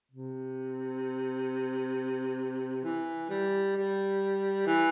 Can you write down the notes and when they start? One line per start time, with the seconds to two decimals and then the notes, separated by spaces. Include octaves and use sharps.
0.11 C3
2.84 E3
3.29 G3
3.76 G3
4.66 E3